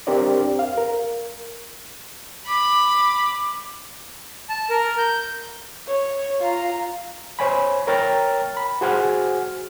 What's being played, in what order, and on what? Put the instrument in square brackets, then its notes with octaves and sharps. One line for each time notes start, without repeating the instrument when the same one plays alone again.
[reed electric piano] C4 D4 G4 A#4 C5 D5
F5
A#4
[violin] B5 [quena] D6
[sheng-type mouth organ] A5
A#4
G6
[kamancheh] C#5
F4 A#5
[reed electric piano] C5 C#5 G#5 B5
A#4 C#5 G5 A#5 F6 A6
B5
F#4 G#4 C5 F#5 G#5 F6